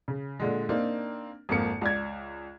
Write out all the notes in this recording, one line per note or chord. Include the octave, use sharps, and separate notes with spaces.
C#3
A#2 D3 G#3
A#3 C4 D4 D#4
G#1 F2 A#3 C#7
C#2 D5 G#6